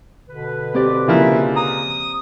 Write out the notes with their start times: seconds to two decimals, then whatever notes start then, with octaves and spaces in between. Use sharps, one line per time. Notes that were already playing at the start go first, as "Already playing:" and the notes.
0.29 B2 D3 B4
0.74 C4 G4 D5
1.08 C#3 F3 A#3 E4
1.56 A#5 D#6